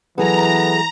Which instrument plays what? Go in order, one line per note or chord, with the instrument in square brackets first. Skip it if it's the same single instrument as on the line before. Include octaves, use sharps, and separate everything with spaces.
[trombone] E3 [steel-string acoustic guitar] F#3 G#4 A4 [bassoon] B3 [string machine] A#5